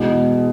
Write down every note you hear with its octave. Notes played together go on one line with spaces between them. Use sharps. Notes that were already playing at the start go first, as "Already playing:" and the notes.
Already playing: E2 B2 G#3